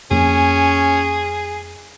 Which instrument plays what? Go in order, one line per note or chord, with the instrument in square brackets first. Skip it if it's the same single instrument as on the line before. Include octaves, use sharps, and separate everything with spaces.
[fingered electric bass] F2 A#3 [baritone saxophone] C#4 [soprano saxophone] G#4